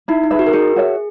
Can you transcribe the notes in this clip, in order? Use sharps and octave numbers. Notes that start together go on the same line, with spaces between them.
D#4 E4
D#4
G#4 B4 E5
F#4
A#4
D#4 G#4
F#4 C#5 E5